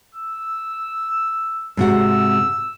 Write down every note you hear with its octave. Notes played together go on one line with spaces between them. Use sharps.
E6
G#2 C3 F#4 E6